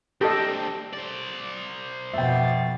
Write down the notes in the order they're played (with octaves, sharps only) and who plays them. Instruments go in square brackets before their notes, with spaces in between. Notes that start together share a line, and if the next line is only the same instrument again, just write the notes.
[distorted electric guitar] C4 D4 [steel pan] G4 A4 D#5
[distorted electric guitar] C5 D5
[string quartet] F2 B2 A6 [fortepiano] E5 G5